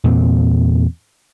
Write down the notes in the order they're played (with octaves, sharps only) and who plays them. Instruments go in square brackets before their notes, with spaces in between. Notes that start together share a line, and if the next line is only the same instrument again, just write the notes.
[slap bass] E2 A#2 A3 C4